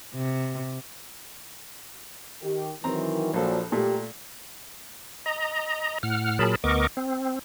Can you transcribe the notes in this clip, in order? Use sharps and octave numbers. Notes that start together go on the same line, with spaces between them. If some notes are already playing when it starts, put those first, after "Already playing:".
C3
D#3 G4
D#3 E3 F#3 C4 A#5
A#1 A#2 F3 F#3 A4
A#2 A3 G4 A#4
D#5 A#5
A2 F#5 F6
A#2 F#3 G#4 A#4 A5 B5
D2 B3 A#4 D#5 C#6 D6
C4